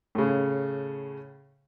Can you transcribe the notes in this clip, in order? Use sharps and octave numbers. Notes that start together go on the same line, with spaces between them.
A2 C#3